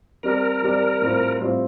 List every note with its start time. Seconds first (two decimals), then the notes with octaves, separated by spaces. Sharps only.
0.23 G3 C4 G4 A#4 D5
0.62 G3 C4 G4 D5
1.02 A2 G3 C4 F4 C5
1.41 A2 G3 C4 F4 C5